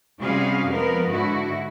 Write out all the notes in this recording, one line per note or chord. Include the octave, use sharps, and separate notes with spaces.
C3 G3 C#4 F#4 G#4 F5
F2 F3 G#3 B3 A#4 B4
G#2 D3 E4 F#4